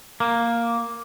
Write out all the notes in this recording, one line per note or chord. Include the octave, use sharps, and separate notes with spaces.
A#3